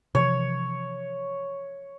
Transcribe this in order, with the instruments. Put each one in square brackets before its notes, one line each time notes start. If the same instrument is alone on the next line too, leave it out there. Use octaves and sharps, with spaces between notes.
[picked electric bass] C3 E3 F3 [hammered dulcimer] C#5